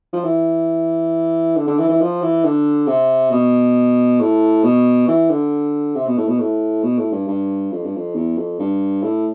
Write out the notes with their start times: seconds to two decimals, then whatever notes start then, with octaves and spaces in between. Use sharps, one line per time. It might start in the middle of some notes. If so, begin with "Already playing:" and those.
0.13 F3
0.24 E3
1.56 D3
1.67 D3
1.79 E3
1.89 E3
2.01 F3
2.22 E3
2.44 D3
2.87 C3
3.32 B2
4.20 A2
4.64 B2
5.08 E3
5.30 D3
5.96 C3
6.07 B2
6.18 A2
6.28 B2
6.40 A2
6.84 B2
6.98 A2
7.12 G2
7.28 G2
7.72 F2
7.84 G2
7.96 F2
8.15 E2
8.38 F2
8.60 G2
9.03 A2